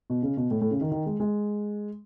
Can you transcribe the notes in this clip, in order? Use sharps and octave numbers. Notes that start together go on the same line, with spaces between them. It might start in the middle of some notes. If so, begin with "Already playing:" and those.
B2
C#3
B2
A2
A2
C#3
D#3
D#3
G#3
G#3